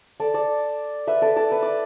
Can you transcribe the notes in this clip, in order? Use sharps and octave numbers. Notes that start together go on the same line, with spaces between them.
A4 D5
A4 D5
B4 E5
A4 D5
A4 D5
B4
D5